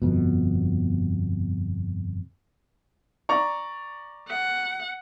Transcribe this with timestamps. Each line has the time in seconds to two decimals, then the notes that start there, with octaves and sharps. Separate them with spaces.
0.02 G1 F2 B2
3.29 D5 A#5 C#6
4.28 F#5